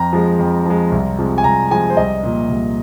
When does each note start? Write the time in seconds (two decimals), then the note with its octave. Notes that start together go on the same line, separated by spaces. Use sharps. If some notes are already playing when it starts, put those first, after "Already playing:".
Already playing: F2 A#5
0.13 F3 G#3
0.39 F2
0.66 F3 G#3
0.92 C2
1.18 C3 F3 G#3
1.38 G#5
1.44 C2 A#5
1.71 C3 F3 G#3 G#5
1.90 C5
1.97 C2 D#5
2.23 A#2 F3
2.49 C2